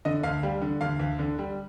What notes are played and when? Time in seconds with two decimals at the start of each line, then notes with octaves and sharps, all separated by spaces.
0.05 D3 D#5
0.23 D2 F5
0.43 G3
0.62 D3
0.81 D2 F5
0.99 D2
1.19 D3
1.38 G3